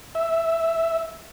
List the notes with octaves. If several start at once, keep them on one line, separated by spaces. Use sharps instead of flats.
E5